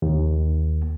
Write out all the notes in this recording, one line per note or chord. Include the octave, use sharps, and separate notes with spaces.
D#2